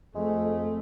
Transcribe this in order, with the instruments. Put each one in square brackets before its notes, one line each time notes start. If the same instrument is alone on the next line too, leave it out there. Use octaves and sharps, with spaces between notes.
[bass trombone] F2 [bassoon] G#3 [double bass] A3